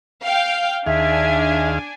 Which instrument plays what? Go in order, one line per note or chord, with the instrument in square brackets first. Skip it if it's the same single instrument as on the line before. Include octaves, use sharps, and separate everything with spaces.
[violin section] F5 G5
[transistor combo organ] D#2 G#4 F5 [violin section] D4 G#5 [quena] E5